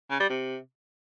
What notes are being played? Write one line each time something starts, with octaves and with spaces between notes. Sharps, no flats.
C#3
G3
C3